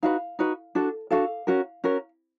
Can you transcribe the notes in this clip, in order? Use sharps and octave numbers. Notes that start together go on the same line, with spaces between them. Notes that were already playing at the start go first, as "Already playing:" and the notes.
D#4 F#4 B4 F5
D#4 F#4 B4
D4 F#4 A4
D4 F#4 A4 F5
C#4 F#4 A#4
C#4 F#4 A#4